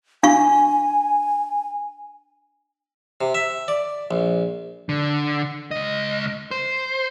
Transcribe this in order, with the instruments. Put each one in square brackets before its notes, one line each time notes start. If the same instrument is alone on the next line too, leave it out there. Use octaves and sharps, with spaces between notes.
[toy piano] D4 F5 C#6 [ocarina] G#5
[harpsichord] C3
E5
D5
A#1
[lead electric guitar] D3
C#2 D#5
C5